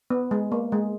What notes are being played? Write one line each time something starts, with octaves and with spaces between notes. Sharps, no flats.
B3
G#3
A#3
G#3